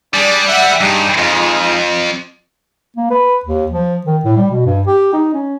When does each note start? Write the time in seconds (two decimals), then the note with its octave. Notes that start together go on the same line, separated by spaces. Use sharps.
0.14 G3 D4 G#4 D5
0.48 E5 F#5
0.81 G2 G#3 D#4 G4
1.18 F2 G#3 D#4 F4
2.97 A#3
3.11 B4
3.46 D#2
3.72 F3
4.07 D#3
4.25 A2
4.37 G3
4.51 B2
4.66 G2
4.87 G4
5.13 D#4
5.33 C#4